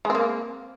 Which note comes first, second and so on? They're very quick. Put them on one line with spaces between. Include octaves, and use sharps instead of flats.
G#3 C4 A#3